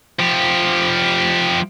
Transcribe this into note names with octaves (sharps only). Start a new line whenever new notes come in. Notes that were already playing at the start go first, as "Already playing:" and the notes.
F3 G4